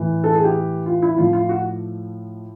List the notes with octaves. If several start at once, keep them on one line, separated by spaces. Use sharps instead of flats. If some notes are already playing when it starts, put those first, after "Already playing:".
Already playing: A2 E3
A4
G#4
G4
F4
E4
A2 F3 F4
F4
F#4